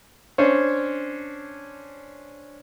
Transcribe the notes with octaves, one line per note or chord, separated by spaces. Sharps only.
C#4 D4 C5 C#5